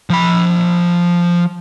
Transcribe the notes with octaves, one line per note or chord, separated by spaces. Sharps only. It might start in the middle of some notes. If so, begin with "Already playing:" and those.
F3 B5